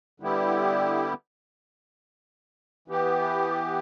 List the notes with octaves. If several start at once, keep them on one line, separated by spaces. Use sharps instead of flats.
D3 G3 B3 E4 G4
E3 B3 G4